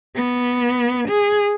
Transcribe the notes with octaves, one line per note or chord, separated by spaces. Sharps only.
B3
G#4